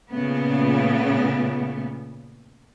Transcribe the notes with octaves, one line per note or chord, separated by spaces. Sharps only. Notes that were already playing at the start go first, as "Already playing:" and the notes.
A#2 C#3 A3 B3